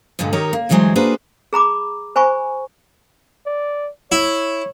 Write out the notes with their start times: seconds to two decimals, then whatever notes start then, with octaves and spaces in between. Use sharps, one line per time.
0.19 D2 G2 A#2 D3 G#3
0.33 D#3 D#4 G4 A#4 C#5
0.53 A#3
0.69 D2 G2 E3 F#3 G#3 C5
0.95 A#3 D4 F#4 G#4 B4 C5
1.53 G#4 A#5 B5 D6
2.16 C5 G#5 B5 C#6
3.46 D5
4.12 E4 C#5